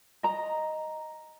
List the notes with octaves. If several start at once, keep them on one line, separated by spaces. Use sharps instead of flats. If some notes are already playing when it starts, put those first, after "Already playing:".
D#5 A#5